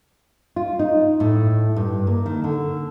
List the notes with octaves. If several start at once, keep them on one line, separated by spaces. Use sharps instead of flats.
F4
D#4
A2
G2
A#3
D#3
D3